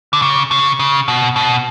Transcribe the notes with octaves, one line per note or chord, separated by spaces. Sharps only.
D3
C#3
C#3
C#3
B2
B2